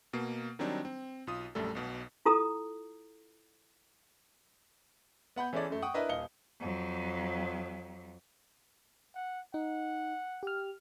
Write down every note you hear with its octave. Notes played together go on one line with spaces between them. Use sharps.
B2 A#3 C7
D#3 F#3 G3 C4 D4 D#4
C4
B1 F4 D#6
A#1 F#2 G3 A3 A4
B1 B2
E4 F4 A4 A#5 D#6
B3 F#5 B5 G6
E3 C#4 G#4 A4 D5
F#2 A3
F#5 G5 C#6 D#6
D4 E4 A#4 B4 D#5 E5
D#1 D#5 F5 C#7 G7
F2 F#3
F#5
D#4 F#5
G4 F6